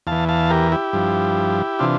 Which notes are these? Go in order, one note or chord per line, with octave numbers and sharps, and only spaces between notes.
E2 E3 F5 A5
F5 A5
G4 A#4
E4 G4
G2 F3
C3 E3 D4 F4